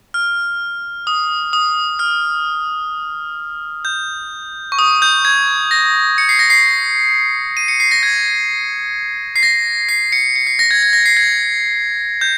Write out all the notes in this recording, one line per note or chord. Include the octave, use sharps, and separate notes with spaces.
F6
D#6
D#6
F6
G6
C#6
D#6
G6
G#6
A#6
C#7
C7
A#6
C7
D#7
C#7
C7
A#6
G#6
C7
A#6
C7
C#7
C#7
C7
A#6
G#6
G#6
A#6
C7
G#6
G6